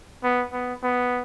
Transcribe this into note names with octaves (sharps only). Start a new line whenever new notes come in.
B3
B3
B3